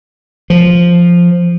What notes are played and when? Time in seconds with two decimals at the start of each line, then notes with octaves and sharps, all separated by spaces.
0.50 F3